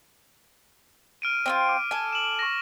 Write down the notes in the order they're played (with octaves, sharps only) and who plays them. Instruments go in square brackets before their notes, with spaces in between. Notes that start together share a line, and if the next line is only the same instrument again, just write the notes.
[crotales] F6 D7 D#7
[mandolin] C4 E4 F4
[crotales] D6
[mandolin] A4 G#5
[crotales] E7 F#7
C#6 A#6